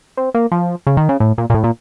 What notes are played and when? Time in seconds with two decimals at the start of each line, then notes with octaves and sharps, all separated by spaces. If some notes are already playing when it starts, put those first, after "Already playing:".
0.17 C4
0.34 A#3
0.52 F3
0.87 C#3
0.97 D#3
1.09 C#3
1.20 A2
1.38 A#2
1.50 A#2
1.54 A2
1.64 A#2